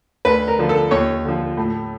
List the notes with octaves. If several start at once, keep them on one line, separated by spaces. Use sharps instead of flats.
D2 B4
A#4
D3 F3
A4
D#2 C#5
D3 F3
A2